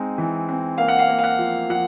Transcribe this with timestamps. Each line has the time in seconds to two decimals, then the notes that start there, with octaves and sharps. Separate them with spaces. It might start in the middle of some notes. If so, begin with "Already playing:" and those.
Already playing: G#3 C4 D#4
0.18 E3
0.48 C4
0.78 A#3 F5
0.88 F#5
0.99 F5
1.09 A#3
1.19 F5
1.24 F#5
1.39 F3
1.70 F3 F#5